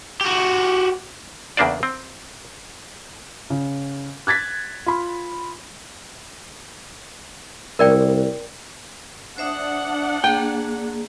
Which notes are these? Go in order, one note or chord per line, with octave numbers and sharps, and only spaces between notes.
F#4 G4
E2 C#3 A#3 D4 C5 D5
C4
C#3
F#6 G#6 A6 B6
F4 B5
C2 A#4 D5 G5
D4 C5 E5 F#5 D#6
A#3 G#4 G5